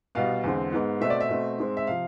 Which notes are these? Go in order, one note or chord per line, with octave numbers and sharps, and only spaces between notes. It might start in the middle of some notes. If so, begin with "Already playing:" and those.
C2 B2 B3 F5
E2 D3 G#3 C4
G#2 G#3 B3
B2 A3 C4 E5
D5
E5
B2 A3 C4
G#2 G#3 C4
E5
C3 F3 F5